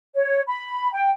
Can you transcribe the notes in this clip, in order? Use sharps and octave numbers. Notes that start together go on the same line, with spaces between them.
C#5
B5
G5